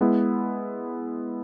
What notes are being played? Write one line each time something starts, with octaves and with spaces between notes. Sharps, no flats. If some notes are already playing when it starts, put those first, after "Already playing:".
G#3 B3 E4